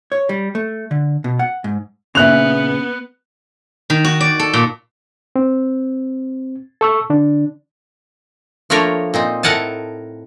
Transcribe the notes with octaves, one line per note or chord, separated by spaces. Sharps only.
C#5
G3
A3
D3
B2
F#5
G#2
A#2 C#3 B3 E5 F#6 F7
D#3
F#4
D5
A4
A#2
C4
A4 C#6 E6
D3 D4
F3 A3 A#3 D4 A#4 C#5
A#2 C4 D#4
A2 A4 A#4 F#5 G#5 A5